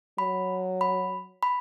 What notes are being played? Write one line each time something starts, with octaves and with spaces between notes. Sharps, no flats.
F#3 B5
B5
B5